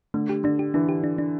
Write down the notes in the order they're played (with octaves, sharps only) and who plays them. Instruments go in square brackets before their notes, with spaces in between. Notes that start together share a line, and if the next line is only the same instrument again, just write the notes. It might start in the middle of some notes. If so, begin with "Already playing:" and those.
[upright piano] D3 [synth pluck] A3
[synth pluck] G4
[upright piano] D3 [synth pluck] D4
[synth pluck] G4
[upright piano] E3 [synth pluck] D4
[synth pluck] G4
D4
D4